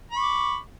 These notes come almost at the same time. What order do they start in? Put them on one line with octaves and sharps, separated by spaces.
B5 C#6 D6